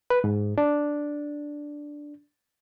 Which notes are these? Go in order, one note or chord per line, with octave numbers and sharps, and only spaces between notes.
B4
G#2
D4